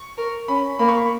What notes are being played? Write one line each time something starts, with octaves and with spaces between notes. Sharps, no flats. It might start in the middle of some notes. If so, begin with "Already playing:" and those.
Already playing: C#6
A#4
C#4 B5
A#3 B5
C#6
B5